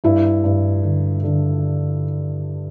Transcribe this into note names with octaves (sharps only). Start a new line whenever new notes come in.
G2 E4
G2
D3
D3